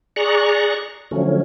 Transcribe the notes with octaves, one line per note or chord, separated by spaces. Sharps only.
G#4 D5 A#5 C#6 F#6
D3 F3 F#3 A3 C#4